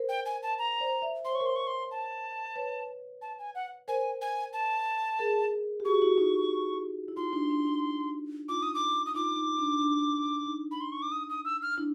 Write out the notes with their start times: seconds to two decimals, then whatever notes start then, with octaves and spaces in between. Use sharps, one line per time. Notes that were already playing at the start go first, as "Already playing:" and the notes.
Already playing: A#4 C5
0.09 G5
0.25 G#5
0.43 A5
0.58 A#5
0.81 C5 D5
1.02 D5 E5
1.25 C5 C6
1.33 C#5 C#6
1.40 A#4 C5
1.46 C6
1.56 C#6
1.67 C6
1.91 A5
2.56 B4 C#5
3.21 A5
3.39 G#5
3.55 F#5
3.88 A#4 C5 G#5
4.21 G#5
4.53 A5
5.19 G#4 A#4
5.80 G4
5.85 F#4 G#4 C#6
6.02 E4 F#4
6.18 D#4 F4
7.08 E4
7.17 D#4 F4 C6
7.33 D4 E4
7.50 D4
7.67 D#4
8.49 D#4 F4 D6
8.62 D#6
8.74 D6
9.06 D#6
9.15 D#4 F4 D6
9.36 D#4
9.59 D4
9.81 D4
10.46 D#4
10.71 B5
10.81 C6
10.92 C#6
11.02 D6
11.12 D#6
11.29 D#6
11.45 E6
11.62 F6
11.78 D4 E4